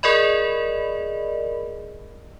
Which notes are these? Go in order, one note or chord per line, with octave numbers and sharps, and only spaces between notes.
G#4 A#4 D5 D#5 B5